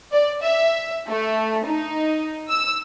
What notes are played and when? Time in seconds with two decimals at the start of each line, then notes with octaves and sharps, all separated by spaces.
0.12 D5
0.42 E5
1.08 A3
1.65 D#4
2.49 E6